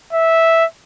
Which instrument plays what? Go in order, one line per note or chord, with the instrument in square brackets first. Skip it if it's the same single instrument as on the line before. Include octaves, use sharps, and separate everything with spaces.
[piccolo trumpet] E5